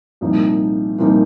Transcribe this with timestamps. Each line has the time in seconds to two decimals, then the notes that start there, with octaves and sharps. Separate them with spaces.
0.21 C2 A#2 F3 C4 D#4
0.99 C2 A#2 F3 C4 D#4